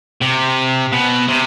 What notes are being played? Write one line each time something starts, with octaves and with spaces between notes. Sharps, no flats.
C3
B2
C3